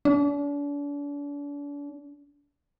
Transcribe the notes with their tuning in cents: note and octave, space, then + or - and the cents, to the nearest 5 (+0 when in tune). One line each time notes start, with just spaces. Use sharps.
D4 -40